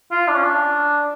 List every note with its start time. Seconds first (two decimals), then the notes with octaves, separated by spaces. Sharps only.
0.11 F4
0.28 D4
0.35 C#4
0.43 D4